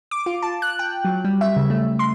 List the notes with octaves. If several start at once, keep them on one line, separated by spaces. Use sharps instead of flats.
D6
F4
A5
F#6
G5
F#3
G3
E5
C#3
A3
C6